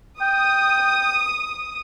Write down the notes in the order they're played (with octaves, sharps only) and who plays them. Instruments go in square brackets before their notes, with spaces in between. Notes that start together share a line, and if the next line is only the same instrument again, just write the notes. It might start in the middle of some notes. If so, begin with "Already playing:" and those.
[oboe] G5 [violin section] D#6